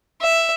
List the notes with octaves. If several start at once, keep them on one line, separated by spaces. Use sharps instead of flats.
E5